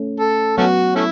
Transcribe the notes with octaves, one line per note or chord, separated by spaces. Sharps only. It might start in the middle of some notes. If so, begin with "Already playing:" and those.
Already playing: A3 C#4
A4
F#3 A3 B3 C#4 F#4
A3 C#4 E4